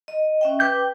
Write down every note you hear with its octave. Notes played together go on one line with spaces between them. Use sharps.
D#5
C#4 E5 G5
B4 G5 D6 G6